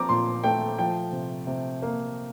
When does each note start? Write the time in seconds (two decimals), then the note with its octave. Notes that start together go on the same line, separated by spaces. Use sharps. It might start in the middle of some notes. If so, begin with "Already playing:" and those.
Already playing: F3 C4 A#5 D6
0.09 A#2 C6
0.44 A3 G5
0.79 F3 G5
1.13 C3
1.47 C3
1.82 A#3